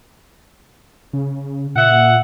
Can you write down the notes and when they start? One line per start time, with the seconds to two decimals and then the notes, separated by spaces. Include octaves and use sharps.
1.13 C#3
1.76 A#2 E5 F#5